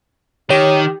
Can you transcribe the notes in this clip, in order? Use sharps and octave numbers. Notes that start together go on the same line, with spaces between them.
D#3 G4 C#5